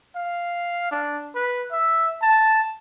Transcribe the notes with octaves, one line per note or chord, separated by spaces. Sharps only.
F5
D4
B4
E5
A5